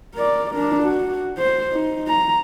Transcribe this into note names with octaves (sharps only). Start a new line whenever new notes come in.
A#4 D5
D4 A#4
F#4
C5
D#4
A#5